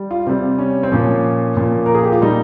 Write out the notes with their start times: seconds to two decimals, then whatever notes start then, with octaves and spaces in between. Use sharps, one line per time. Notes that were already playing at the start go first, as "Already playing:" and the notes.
Already playing: G3
0.11 F4
0.27 C3 G3 C4
0.59 C#4
0.83 C4
0.91 A#2 F3 C#4
1.57 A#2 F3
1.86 A#4
1.94 G#4
2.03 G4
2.12 F4
2.22 A#2 G3 D#4